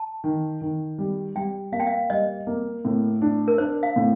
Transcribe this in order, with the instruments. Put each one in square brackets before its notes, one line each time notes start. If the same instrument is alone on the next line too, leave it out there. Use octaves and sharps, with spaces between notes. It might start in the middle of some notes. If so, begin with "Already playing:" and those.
Already playing: [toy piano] A5
[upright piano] D#3
D#3
G3
[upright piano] G3 [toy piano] G5
[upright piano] A#3 [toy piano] F5
[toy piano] G5
F5
[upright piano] G3 [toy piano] D#5
[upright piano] A#3
A2
D4
[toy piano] A#4
[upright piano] D4 [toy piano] C5
[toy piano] F5
[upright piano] A2